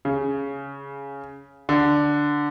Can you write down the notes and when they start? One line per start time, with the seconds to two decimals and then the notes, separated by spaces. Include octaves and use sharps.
0.05 C#3
1.69 D3